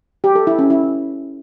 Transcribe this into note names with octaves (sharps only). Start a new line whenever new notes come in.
G4
A4
E4
C#4
E4